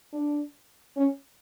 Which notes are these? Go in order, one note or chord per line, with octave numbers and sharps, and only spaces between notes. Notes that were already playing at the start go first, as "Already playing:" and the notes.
D4
C#4